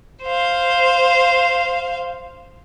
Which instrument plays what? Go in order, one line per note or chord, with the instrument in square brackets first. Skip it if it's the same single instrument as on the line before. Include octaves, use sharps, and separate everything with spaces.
[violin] C5 F5